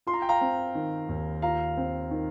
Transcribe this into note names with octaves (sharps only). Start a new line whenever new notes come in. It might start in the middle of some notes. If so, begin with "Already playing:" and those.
F4 C6
A#5
G5
F5 A#5
C4
D#3
D#2
F4 F5 A#5
C4
D#3